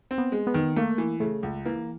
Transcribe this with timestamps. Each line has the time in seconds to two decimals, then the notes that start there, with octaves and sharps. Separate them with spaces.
0.11 C4
0.18 B3
0.32 G#3
0.47 B3
0.54 D#3
0.76 A3 A#3
0.98 E3
1.20 C#3 A3
1.43 C#2
1.66 E3 A#3